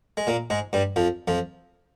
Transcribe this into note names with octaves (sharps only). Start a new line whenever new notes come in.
G#3
A#2 A#3
G#2 G#3
G2 G3
F2 F3
F2 F3